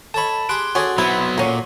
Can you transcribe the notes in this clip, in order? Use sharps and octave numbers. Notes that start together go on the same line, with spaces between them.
A4 C#5 D#5 A5 B5
G4 G#4 C6 D#6 F#6 D7
C#4 F#4 G#4 A4 D5
E3 F#3 B3 C4 E4 C5 B5
A#2 F#3 A3 A#3 C#4